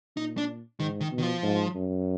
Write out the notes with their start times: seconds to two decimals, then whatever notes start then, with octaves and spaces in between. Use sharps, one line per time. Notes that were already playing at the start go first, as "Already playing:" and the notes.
0.16 A#2 D#4
0.37 D4
0.79 G#2 D#3
1.01 D#3
1.12 B2
1.18 D#3
1.23 F3
1.43 G#2
1.75 F#2